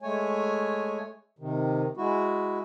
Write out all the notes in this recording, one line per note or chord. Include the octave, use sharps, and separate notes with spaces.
G#3 A3 C#5 G#5
C3 D#3
G#3 E4 F#4